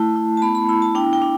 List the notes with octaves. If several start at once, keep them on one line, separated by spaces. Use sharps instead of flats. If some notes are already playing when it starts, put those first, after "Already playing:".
Already playing: A3 E4 A5
E4
A5
B3 B5
B5
E4 B5
A5
D4 G5
G5
D4